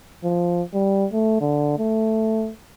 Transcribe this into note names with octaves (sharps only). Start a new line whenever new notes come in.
F3
G3
A3
D3
A3